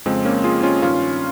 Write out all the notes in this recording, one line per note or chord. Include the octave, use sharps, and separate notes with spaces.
F2 C#3 F3 G#3 C4
A#3 C#4
F4 G#4
C#4 F4
G2 D#3 C#4 F4